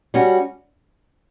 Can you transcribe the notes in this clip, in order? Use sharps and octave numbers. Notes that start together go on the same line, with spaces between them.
G3 C#4 F#4